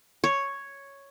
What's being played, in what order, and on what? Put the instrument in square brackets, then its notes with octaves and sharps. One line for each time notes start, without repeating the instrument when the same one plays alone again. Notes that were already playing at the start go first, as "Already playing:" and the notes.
[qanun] C#5